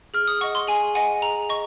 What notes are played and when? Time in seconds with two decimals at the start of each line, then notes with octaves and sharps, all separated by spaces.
0.14 G#4 F6
0.28 D#6
0.41 D#5 F#5 C#6
0.55 C6
0.68 G#4 G#5
0.95 D#5 F#5 G#5
1.22 G#4 A#5
1.49 D#5 C#6